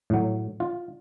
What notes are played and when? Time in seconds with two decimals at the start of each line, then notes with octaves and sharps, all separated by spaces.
0.10 A2 F#3
0.60 F4